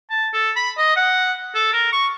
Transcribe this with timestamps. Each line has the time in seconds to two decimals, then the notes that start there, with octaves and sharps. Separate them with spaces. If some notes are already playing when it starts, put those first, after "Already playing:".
0.10 A5
0.34 A4
0.56 B5
0.78 D#5
0.96 F#5
1.55 A4
1.73 A#4
1.93 C#6